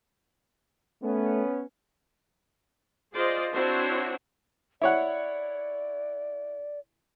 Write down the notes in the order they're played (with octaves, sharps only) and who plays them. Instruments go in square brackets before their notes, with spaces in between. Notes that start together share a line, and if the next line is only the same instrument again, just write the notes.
[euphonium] A3 [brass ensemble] B3 C#4
[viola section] F4 G#4 C5 D5 D#5
C4 D4 E4 F#4 C5 C#5
[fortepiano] E4 C#5 F#5 [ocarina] D5